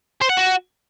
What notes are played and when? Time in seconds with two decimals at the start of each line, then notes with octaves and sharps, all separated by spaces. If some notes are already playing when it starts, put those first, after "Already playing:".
0.21 C5
0.29 F#5
0.37 F#4